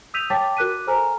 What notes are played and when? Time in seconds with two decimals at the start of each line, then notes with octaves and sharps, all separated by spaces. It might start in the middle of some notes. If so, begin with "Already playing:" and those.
0.14 D#6 E6 G6 B6 D#7 F7
0.30 C#5 G5 A5 D6 A6 B6
0.57 F#4 A#4 D6 F#6 B6 D#7
0.87 A4 C5 G#5 A#5 F6